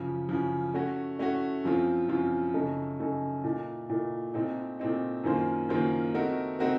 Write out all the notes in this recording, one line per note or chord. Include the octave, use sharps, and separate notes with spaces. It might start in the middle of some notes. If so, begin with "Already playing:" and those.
Already playing: F#2 C#3 F3
F#2 C#3 F3
A3 C#4 F#4
A3 C#4 F#4
F#2 F3 C4 F4
F#2 F3 C4 F4
F#2 C#3 A3 D#4 A4
F#2 C#3 A3 D#4 A4
A#2 A3 D#4
A#2 A3 D#4
A#2 A3 C4 D#4
A#2 A3 C4 D#4
F#2 D#3 A#3 F4 C5
F#2 D#3 A#3 F4 C5
A3 C4 D#4 F#4 A#4
A3 C4 D#4 F#4 A#4